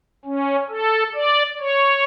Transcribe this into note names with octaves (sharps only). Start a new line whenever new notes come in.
C#4
A4
D5
C#5